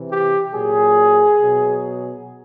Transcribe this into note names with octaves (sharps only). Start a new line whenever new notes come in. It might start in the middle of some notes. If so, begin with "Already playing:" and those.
Already playing: C3 E3
G4
A#2 F#3 G#4
B2 F#3